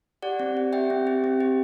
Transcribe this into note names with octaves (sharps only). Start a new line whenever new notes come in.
G4 D5 F#5
C4
G4
G4 E5 G5
C4
G4
C4
G4